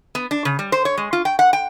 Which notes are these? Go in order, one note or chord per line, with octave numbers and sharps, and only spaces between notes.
B3
D4
C#3
G3
C5
C#5
G#3
F4
G5
F#5
G5